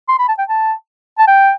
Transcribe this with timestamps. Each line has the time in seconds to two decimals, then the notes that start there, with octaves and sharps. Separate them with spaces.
0.09 C6
0.19 B5
0.28 A5
0.39 G5
0.49 A5
1.18 A5
1.27 G5